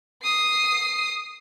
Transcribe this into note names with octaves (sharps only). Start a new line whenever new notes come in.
D#6 C7